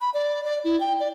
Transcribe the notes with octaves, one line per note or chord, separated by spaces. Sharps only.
B5
D5
D5
E4
G5
D5